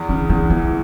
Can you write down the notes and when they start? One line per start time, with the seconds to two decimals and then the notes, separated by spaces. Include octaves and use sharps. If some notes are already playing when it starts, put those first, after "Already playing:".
Already playing: E2
0.09 C#3 D4
0.30 E2 C#4
0.50 E3 B3